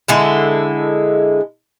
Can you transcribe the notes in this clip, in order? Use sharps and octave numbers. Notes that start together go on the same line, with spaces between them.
D3 G#3 E4